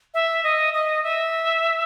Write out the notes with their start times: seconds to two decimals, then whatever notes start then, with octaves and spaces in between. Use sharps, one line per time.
0.14 E5
0.44 D#5
0.74 D#5
1.03 E5